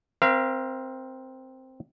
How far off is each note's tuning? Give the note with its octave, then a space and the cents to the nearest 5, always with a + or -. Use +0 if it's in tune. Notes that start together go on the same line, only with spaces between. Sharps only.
C4 +0 A#4 +30 F5 -35